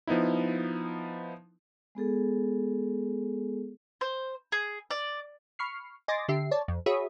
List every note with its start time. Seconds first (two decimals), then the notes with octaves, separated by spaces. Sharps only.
0.07 F3 B3 D#4 E4
1.95 G#3 B3 G#4 A4
4.01 C5
4.52 G#4
4.90 D5
5.59 B5 C#6 F6 C7
6.08 D#5 G#5 C6 D6 A6 A#6
6.28 D3 G4 E5 C7
6.51 C#5 D5 A5
6.68 F2
6.86 F#4 G#4 C#5 E5 B5 D#6